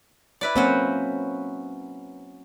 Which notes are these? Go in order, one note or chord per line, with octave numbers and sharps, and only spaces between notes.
E4 B4 D5
F#3 A#3 C4 C#4 F#4 C5